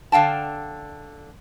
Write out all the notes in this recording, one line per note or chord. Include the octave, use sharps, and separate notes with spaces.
D3 F5 G5 A5